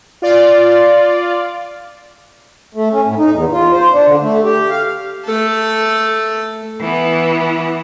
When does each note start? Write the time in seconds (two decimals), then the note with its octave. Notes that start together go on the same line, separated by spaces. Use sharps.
0.22 F4 D5
2.75 A3
2.92 C#4
3.06 A2
3.18 D#4
3.33 E2
3.52 F4
3.73 C5
3.93 D4
4.07 D3
4.21 A3
4.44 G4
4.70 F5
5.25 A3 A4
6.80 E3 B3